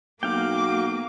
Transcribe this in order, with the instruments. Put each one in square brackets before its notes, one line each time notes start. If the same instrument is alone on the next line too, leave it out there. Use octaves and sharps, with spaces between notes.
[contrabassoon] B1 [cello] A#3 [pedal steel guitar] F#4 F5 G5 [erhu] D6